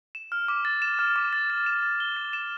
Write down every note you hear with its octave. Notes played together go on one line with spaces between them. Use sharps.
E7
F6
D6
A6
E7
F6
D6
A6
A6
E7
A6
G7
A6
E7